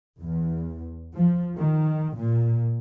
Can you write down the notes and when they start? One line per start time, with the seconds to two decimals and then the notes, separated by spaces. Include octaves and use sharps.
0.20 E2
1.16 F3
1.57 D#3
2.16 A#2